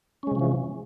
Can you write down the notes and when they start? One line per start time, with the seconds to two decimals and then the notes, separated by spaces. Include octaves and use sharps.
0.23 C#4
0.27 G#3
0.31 C3
0.35 F3
0.39 E3